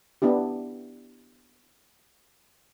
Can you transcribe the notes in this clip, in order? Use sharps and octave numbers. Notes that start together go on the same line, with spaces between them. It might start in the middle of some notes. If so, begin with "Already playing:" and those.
B3 D4 E4 G4